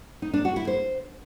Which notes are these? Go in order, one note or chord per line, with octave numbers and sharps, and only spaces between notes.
D#4
D4
F#4
E4
C5